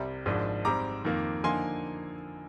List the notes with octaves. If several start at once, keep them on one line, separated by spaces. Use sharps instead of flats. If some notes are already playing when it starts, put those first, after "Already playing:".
Already playing: C2 C3 G3
G#1 G#2 F3 G#3 D4
G#2 G3 C4 A#5 D6
F2 D#3 A#3
D3 F3 A#3 D#4 G#5 C6